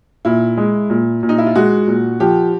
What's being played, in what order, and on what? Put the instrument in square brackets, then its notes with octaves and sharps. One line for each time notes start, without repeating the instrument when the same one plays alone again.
[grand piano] A#2 [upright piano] E4
[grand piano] G#3
A#2
A#2
[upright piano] D#4
E4
F4
[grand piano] G#3 [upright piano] F#4
[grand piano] A#2
[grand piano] F3 [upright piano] G4